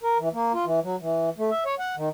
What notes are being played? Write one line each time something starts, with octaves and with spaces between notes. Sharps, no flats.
A#4
E3
A#3
F4
E3
F#3
E3
A3
E5
C#5
F#5
D#3